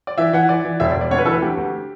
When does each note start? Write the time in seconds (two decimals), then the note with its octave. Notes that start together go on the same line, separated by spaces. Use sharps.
0.07 D5
0.18 E3 E5
0.33 E3 F#5
0.49 E3 D5
0.65 E3
0.80 E1 E5
0.90 D5
0.96 E1
1.01 D5
1.11 D2 C#5
1.18 B4
1.25 E3 A4
1.32 B4
1.42 D2 G4
1.58 D2